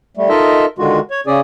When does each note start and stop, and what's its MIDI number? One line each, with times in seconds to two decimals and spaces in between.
0.17 0.29 55
0.17 0.29 57
0.29 0.66 63
0.29 0.66 65
0.29 0.66 69
0.29 0.66 70
0.29 0.66 75
0.29 0.66 76
0.78 1.00 50
0.78 1.00 51
0.78 1.00 56
0.78 1.00 65
0.78 1.00 66
1.11 1.21 73
1.27 1.40 49
1.27 1.40 61
1.27 1.40 68
1.27 1.40 74